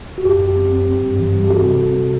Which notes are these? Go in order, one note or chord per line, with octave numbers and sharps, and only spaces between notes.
F#4
F#2 G4
F#2
C4
C4
G2
G2
E3
G3
G4
C4 F#4 A4
C3
C3